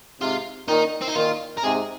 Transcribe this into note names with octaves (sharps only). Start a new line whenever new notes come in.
G#2 C3 F4
A#2 D#3 D#4
C4
D#4
A#2 D#3 F4
A#4
G#2 C3 G#4